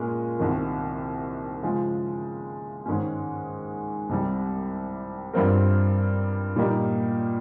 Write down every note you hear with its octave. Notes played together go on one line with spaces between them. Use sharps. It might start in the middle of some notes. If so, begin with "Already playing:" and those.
Already playing: A#2 G#3 C#4 A#4
C2 C3 D#3
C#3 F3 G#3
G#2 D#3 G#3 C#4
C2 C3 G3
G2 G3 C4 F4 A#4
A#2 G3 A#3 D#4 G4